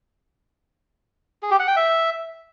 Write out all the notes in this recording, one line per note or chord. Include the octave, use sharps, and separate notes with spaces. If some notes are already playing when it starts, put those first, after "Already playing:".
G#4
G4
F#5
G5
E5